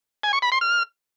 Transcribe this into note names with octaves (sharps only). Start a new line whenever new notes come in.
G#5
C#6
B5
C6
F6